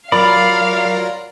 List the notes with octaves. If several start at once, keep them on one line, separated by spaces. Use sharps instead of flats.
F#3 F4 A#4 D5 F5 B5